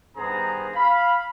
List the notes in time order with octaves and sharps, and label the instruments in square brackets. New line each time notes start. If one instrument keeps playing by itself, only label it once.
[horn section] G2 D#3 B3 G#4 C5 A#5
F5 B5